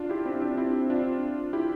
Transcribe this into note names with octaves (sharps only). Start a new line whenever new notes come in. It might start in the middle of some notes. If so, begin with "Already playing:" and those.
Already playing: D4 F4
E4 G4
C4 E4
D4
C4 E4
D4 F4
E4 G4